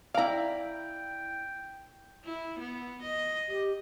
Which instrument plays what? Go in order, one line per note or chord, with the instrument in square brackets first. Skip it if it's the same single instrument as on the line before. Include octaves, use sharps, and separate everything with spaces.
[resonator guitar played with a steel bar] E4 D5 [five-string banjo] F5 A#5 [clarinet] G5
[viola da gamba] E4
B3
D#5
[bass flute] G4